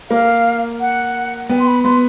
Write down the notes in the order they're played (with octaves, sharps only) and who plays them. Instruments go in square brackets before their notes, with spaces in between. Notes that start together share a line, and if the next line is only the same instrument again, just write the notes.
[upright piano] A#3 [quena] F5
[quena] F#5
[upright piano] B3 [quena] G5
[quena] C6
B5
[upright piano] B3 [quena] C6